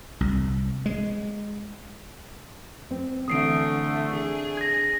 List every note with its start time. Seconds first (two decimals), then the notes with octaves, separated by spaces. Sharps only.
0.21 C2
0.86 G#3
2.91 C4
3.28 D3 E3 A3 D#6 C7 D7
4.09 D4 G#4
4.57 G#6 A#6